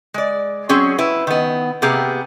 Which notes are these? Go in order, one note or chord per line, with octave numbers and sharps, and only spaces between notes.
G#3 D5
F#3 C4 C#4 G#4
E4 B4
D#3 B3
C3 A#3 B3 G4 G#4